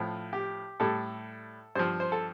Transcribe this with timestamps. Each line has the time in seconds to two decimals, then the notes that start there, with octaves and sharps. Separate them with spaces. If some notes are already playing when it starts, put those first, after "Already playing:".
Already playing: A2 F3 F4
0.33 G4
0.80 A2 G3 A4
1.75 G2 F3 C5
2.00 C5
2.12 A4